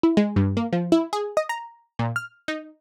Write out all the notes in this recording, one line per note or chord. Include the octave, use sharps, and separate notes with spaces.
E4
G#3
G2
A#3
F3
E4
G#4
D#5
A#5
A#2
F6
D#4